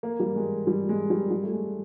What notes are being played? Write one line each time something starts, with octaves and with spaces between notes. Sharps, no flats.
A#3
G3
G#3
G3
G#3
G3
G3
A3
G#3